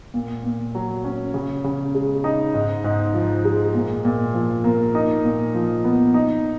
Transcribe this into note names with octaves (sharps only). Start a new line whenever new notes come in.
A#2
A#2
F#3
C#4
C#3
C#3
G#3
D#4
G#2
G#2
F3
G#3
A#2
A#2
F3
A#3
D#4
A#2
F3
B3
D#4